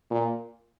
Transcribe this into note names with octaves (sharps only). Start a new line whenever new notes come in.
A#2